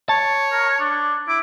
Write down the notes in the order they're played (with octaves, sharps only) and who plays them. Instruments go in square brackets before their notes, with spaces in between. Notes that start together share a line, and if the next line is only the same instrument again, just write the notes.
[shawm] C#5 [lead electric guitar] A5
[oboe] A#4
D4
[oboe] E4 [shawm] D6